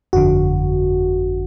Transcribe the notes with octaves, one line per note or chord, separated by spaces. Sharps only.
G1 F2 D3 F#4